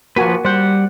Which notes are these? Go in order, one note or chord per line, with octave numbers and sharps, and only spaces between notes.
F3 A#3 F#4 B4 G#5
G3 C5 F#5